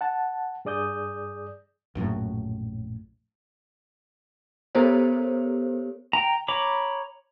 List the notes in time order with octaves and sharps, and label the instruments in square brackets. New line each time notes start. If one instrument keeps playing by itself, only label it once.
[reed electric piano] F#5 A5
G2 G#4 D5 D#6 G6
[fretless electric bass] A#1 F#2 A2 F#3
[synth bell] B3 G4 A4 A#4 C5 C#5
[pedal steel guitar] G5 A#5
C#5 A#5 B5 D6